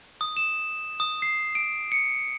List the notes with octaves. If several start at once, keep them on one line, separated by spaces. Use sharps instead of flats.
D#6
E7
D#6
C7
D7
C#7